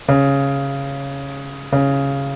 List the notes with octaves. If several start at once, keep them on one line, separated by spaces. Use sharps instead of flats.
C#3
C#3